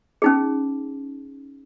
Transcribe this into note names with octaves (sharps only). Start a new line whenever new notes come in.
C#4 D#4 G#4